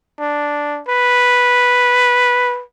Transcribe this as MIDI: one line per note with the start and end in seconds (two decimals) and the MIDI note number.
0.19 0.80 62
0.88 2.62 71